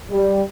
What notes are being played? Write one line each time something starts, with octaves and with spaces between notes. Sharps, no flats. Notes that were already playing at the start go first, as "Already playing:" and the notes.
G3